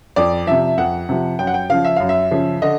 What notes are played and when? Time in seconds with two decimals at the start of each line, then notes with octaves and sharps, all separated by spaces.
0.16 F2 D5
0.47 C3 F3 E5
0.77 F2 F#5
1.09 C3 F3
1.39 F#2 G5
1.47 F#5
1.54 G5
1.70 C#3 F3 F5
1.84 E5
1.96 F#2 F5
2.09 E5
2.31 C#3 F3
2.62 D3 D#5